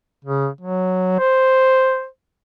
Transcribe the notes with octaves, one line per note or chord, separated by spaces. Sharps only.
C#3
F#3
C5